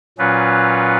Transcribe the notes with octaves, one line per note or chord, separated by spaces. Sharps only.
A#2 F#3 C#4 F4 B4